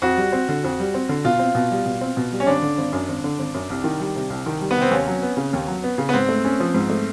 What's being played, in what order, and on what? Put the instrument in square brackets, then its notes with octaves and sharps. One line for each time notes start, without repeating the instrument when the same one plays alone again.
[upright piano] F2 [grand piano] F#4
[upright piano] G3
C4
D3
F2
G3
C4
D3
[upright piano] B2 [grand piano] F4
[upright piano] C4
B2
G3
B2
C4
B2
G3
[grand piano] C#4
[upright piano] G#1 [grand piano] D4
[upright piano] D3
G#1
F#2
G#1
D3
G#1
F#2
C2
D#3
G3
C3
C2
D#3
G3
[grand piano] B3
[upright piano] C3 [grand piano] C4
[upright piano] D#2 [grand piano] C#4
[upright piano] F#3
B3
C#3
D#2
F#3
B3
C#3
[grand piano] B3
[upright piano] G#2 [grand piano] C4
[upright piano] A3
C#4
F3
G#2
A3